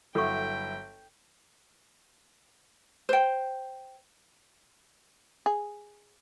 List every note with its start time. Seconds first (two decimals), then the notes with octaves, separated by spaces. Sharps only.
0.15 G1 F#3 E4 A4 G5 C#6
3.09 C5 G5
5.46 G#4